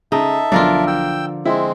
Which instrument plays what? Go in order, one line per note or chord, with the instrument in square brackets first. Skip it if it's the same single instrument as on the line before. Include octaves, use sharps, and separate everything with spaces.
[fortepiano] C#3 [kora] D#4 [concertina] A4 E5
[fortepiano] B1 D4 F5 [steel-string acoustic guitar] D3 F3 [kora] F4 A#4 D5
[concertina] G5 E6
[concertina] G#3 C4 [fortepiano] E4